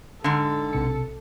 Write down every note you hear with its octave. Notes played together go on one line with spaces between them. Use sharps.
G#2 D3 A4
B1 C3 C#7